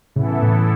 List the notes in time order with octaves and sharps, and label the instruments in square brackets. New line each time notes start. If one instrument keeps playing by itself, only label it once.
[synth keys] A2 C#3 [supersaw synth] E3 B3 E4 A4
[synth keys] A2